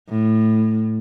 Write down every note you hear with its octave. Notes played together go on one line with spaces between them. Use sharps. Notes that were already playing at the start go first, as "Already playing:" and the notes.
A2